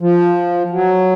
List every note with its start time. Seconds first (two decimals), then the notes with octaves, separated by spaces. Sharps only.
0.01 F3
0.70 F#3